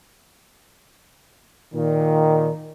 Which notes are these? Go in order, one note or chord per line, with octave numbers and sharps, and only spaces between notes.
A#2 D#3